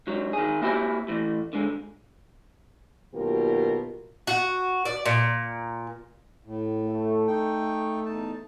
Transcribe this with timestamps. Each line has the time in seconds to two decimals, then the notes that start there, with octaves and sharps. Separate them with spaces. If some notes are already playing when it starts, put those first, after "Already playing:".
0.07 G#2 F#3
0.33 D#3 G#4
0.62 A#3 E4 F#4 G4 G5 G#5
1.08 A2 E3
1.53 D3 G#3
3.14 D#2 B2 F#3 F4 G4 A#4
4.27 F#4
4.85 D5
5.05 A#2
6.44 A2
6.84 A3
7.27 D#4 G5
8.05 E2 D#4 A5